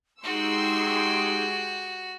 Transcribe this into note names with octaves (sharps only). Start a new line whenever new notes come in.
G#3 D#4 F#4 G4 G5 C6 C#6 E6